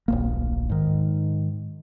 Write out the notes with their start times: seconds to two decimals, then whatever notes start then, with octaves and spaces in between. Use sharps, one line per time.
0.08 D1 A#1 A#3
0.69 G#2 D#3